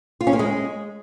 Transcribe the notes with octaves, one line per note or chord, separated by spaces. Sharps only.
F4
C#4
A#3
G#3